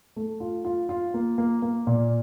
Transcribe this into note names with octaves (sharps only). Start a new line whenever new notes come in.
A3
F4
F4
F4
A#3
A#3
A#3
A#2